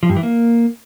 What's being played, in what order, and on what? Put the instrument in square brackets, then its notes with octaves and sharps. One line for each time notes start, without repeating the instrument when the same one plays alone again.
[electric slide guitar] F3
G2
E3
A#3